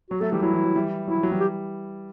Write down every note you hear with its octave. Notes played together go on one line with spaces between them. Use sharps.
F#3 F#4
F#3 A3 A4
E3 G3 G4
F#3 E4
E3
F#3
E3 G3
F#3 E4
E3
F#3
E3 G3
G4